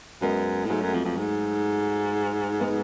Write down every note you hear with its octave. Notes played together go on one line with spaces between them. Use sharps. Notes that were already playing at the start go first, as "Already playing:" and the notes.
F#2 G#3 B3
A2
G#2 F#3 A3
F#2
F2
F2
G#2
G#3 B3